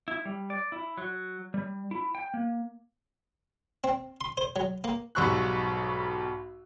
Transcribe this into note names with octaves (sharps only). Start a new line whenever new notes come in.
E4
G3
D5
E4
F#3
G3
E4
G5
A#3
C4
C6
C5
F#3
A#3
B1 G#2 G3 C#6 E6 F#6